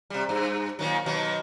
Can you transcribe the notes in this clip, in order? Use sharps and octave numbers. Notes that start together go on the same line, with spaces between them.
C3 G3
G2
A#2 D#3 F#3
B2 D#3 F#3